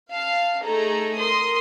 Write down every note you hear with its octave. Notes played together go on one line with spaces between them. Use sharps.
F5 A5
A3 D#4 G#4 A4 A#5
A#4 C6 D#6